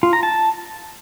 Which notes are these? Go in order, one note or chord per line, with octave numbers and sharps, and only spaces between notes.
F4
A#5
A5